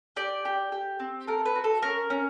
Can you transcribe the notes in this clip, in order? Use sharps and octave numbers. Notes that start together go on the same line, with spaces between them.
G4 D5
G4
G4
C4
A4 A#4
B4
F#4
A4
C#4 A#4
C#4